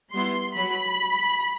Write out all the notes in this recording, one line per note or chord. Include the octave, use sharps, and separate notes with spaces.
G3 B3 E4 C6
F#3 B5